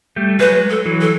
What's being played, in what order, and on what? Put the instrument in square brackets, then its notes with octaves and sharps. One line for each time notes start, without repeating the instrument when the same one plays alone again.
[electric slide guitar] G3 A3
[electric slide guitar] F#3 G#3 [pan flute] B4
[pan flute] A4
[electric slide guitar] E3 F#3
[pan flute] A4